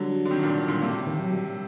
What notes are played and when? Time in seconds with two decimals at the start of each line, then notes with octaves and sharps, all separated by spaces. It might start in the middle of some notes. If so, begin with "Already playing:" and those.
Already playing: D3 F#3 G3
0.25 D3
0.31 C3 D#3
0.43 A#2 D3
0.68 A#2 D3
0.82 A2 C3 A#3
1.07 D#3
1.19 F#3
1.33 G3